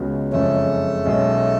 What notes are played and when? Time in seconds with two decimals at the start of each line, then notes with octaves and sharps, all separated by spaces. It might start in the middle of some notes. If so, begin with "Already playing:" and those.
Already playing: C#2 C#3 G#3 B3 F#4
0.31 F#1 F2 C#3 G#3 A3 C#4
1.04 B1 B2 G#3 C#4